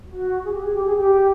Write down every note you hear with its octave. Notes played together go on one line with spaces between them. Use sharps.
F#4
G#4
G4
G#4
G4
G#4
G4